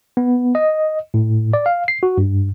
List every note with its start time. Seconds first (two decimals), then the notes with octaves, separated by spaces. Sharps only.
0.17 B3
0.55 D#5
1.14 A2
1.53 D5
1.66 F5
1.88 C7
2.03 F#4
2.18 G2